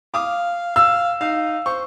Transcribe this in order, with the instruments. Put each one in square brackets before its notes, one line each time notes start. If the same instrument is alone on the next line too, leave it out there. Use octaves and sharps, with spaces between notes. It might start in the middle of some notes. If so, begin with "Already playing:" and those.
[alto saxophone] F5 [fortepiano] D6 D#6
[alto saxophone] F5 [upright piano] E6
[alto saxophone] D#4 [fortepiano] F5
[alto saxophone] C5 [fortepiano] C#6